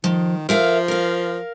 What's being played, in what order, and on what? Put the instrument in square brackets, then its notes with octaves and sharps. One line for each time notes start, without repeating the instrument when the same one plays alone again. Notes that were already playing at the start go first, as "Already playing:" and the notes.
[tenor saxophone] D#3 [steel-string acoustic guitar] F3
[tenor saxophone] F3 [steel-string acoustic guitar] A#4 E5 F5
[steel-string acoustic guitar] A#4 F5